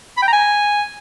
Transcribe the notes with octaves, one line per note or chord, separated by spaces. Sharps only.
B5
G5
A#5
G#5